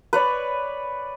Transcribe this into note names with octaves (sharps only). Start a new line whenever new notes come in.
B4 C#5 D5